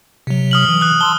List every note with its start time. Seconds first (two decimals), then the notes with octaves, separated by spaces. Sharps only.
0.27 C3 F#3
0.51 D#6 F6 F#7
0.69 E3
0.81 D#6 F#6
1.01 A5 C6 E6 G7